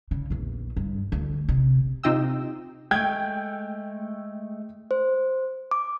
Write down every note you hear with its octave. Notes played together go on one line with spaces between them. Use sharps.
C#3
A#1 E2
G2
D2
C3
C3 D#4 F4 D#5 G5 E6
G#3 A3 G5 G6 G#6
C5
D6